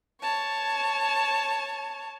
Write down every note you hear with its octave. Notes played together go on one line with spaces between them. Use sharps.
C#5 A5